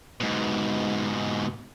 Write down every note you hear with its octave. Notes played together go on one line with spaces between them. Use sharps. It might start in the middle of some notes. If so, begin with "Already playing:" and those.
G#2 B2